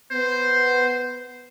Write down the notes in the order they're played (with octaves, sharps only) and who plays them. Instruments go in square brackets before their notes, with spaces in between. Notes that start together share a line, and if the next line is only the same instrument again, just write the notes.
[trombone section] B3 [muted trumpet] C5